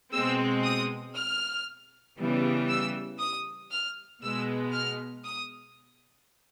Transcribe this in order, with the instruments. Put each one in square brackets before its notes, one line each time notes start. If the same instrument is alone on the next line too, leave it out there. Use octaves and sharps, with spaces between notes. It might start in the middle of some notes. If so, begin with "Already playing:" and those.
[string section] B2 G#3 C4 E6
D#6
F6
C#3 E3 G3 B3
E6
D#6
F6
B2 G#3 B3 E6
F6
D#6